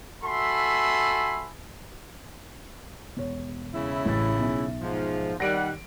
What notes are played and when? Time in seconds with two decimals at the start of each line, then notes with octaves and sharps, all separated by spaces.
0.24 F#4 A4 E5 G#5 B5 C6
3.17 E1 C#5
3.73 C#3 E4
4.06 A1 A6
4.38 B1 E5
4.80 G#2 F3
5.40 D#3 G3 F#5 A#6 D7